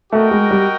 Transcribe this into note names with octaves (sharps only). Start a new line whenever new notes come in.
A3 F#4 A#4 D#5 G5
G#3
G3